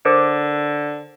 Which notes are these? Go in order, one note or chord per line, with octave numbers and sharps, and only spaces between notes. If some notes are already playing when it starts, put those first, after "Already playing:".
D3 A#4 C5 D6